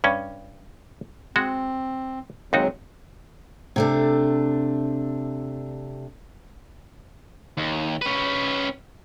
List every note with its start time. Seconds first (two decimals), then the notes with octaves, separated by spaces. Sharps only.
0.04 G2 C#4
1.36 G#3 C4 F#4
2.53 D#2 F#3 G#3 C4 D#4 F#4
3.76 C3 A3 D4
7.57 D#2
8.02 C#4 B4